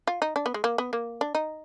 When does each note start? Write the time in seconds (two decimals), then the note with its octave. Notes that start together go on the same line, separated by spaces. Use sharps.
0.07 F4
0.22 D#4
0.36 D4
0.46 B3
0.54 G#3
0.64 A#3
0.78 B3
0.93 A#3
1.21 D4
1.35 D#4